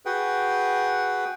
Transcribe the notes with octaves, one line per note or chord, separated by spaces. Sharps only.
F#4 G#4 B4 F#5 G5